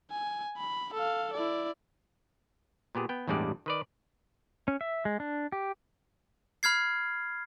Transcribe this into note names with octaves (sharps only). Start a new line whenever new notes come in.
G#5
B5
A4 F5
E4 D5
A#2 B3 G4 G#4
B3 G5
A1 E2 G2 G3 G#3 D5
D#3 B4 D5
C#4
E5
G#3
D4
G4
B5 F6 G#6 C7